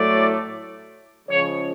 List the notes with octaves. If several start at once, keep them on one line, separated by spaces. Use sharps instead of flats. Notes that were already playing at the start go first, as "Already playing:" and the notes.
Already playing: A2 F#3 A3 D5
C#3 F3 G#3 C#5